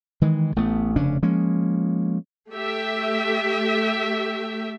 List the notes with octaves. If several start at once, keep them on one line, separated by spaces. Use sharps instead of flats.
D#3 E3 G#3
A1 A3 B3
F1 C#3 C#4 D4
F3 G#3 A#3 C#4
A3 G4 E5